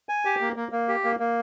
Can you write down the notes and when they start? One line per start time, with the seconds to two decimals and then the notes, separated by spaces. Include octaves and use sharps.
0.09 G#5
0.25 G4
0.41 A#3
0.56 A#3
0.72 A#3
0.88 G4
1.04 A#3
1.20 A#3